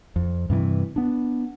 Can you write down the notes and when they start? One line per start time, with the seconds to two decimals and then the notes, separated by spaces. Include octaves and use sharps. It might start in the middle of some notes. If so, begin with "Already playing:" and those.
0.16 F2
0.50 G2 C3 D#3 E3
0.96 B3 D4